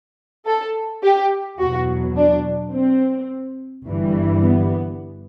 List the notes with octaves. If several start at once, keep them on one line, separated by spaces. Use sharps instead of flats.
A4
G4
E2 B2 F#3 F#4
D4
C4
G1 G2 E3 G3
B3